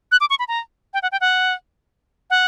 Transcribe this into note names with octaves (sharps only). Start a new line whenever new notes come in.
F#6
D6
C#6
B5
A#5
G5
F#5
G5
F#5
F#5